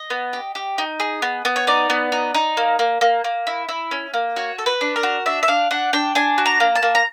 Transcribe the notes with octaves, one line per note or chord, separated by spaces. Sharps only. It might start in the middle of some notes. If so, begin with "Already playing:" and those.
Already playing: D#5
B3
G4
G4
D#4
G#4
B3
B3
C#5
D#4 D5
B3
D#4
D#4
A#3
A#3
A#3
A#3
E4
E4
C#4
A#3
F#4 C#5
A4
B4
D4
A#4
F#4
D4 E5
E5
D4 F5
D4 F#5
D4 G5
D4 G#5
F#4
A#5
A#3
A5
A#3
A#5